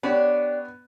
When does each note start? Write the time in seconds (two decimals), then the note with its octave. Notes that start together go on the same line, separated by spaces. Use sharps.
0.03 B3 D4 G4 C#5